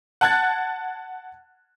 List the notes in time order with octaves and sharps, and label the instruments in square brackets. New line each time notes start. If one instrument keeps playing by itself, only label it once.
[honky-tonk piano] F#5 A5 F#6 G#6 A6